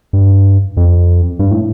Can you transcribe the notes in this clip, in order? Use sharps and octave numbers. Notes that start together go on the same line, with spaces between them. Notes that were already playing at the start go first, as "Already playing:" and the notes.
G2
F2
G2
A2